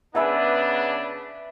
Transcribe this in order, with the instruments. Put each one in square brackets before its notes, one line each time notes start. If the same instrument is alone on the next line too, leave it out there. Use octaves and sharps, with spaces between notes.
[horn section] C#3 B3 D4 [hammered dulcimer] B4 E5 G#5